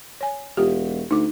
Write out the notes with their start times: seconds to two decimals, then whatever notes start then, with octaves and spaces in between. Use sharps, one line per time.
0.21 C#5 G#5
0.57 E1 F4 G4
1.11 D2 D#4 D6